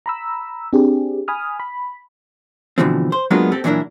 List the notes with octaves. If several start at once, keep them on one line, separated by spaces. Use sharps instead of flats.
A#5 B5 E6
C4 D4 G4 G#4
G#5 B5 D#6 F6
B5
B2 D3 E3 F3 A3 C4
C5
F#3 G#3 A#3 B3 D4 F4
C4 G4 A4
A#2 E3 F#3 D4 E4 A#4